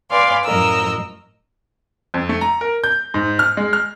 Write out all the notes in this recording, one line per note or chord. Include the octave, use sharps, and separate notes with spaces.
B4 D5 F5 G#5 C6
F#2 A2 F3 A#4 D#5 E6
F2
A3
A#5
A#4
G6
G#2
F6
G#3
F6